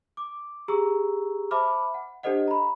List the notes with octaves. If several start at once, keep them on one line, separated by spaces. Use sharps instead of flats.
D6
G4 G#4 A#5 C#6 E6
C5 E5 A5 B5 D6 F6
F#5
D4 G4 A4 C5 D#5 F#5
A#5 B5